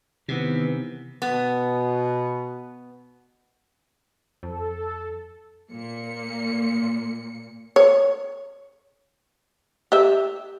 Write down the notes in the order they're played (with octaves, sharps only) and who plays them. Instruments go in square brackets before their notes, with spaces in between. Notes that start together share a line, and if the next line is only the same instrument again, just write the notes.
[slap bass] C3 [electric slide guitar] D#3 E3 B3
[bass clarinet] B2 [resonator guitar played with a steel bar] B3
[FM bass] F2 [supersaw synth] A4
[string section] A#2 A#3 C#7
[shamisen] C#5
G4 E5